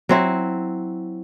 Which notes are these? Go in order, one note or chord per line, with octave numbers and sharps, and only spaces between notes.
F#3 C4 E4